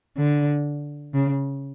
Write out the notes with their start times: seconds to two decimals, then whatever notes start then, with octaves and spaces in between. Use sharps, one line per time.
0.17 D3
1.14 C#3